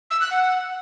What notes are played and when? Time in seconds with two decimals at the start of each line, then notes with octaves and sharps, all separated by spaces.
0.11 E6
0.21 F#6
0.31 F#5